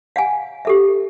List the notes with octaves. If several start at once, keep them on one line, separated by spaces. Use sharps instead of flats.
F5 F#5 G#5
G4 A4 E5